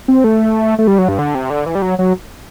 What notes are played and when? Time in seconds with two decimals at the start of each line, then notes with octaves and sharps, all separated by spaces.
0.08 C4
0.24 A3
0.79 A3
0.87 G3
0.98 F#3
1.09 G2
1.19 D3
1.35 C3
1.50 D3
1.66 E3
1.75 G3
1.82 F#3
1.99 F#3